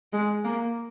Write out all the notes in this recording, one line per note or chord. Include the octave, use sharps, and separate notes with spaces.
G#3
A#3